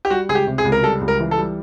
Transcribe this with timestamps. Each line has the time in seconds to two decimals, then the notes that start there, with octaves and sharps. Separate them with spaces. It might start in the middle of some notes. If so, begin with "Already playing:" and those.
0.05 G4
0.10 G3 F#4
0.29 C#2 G#4
0.35 G4
0.47 C3
0.58 G#4
0.65 C#2
0.72 A#4
0.83 G3 A4
1.01 C#2
1.08 A#4
1.20 E3
1.31 A4
1.38 G3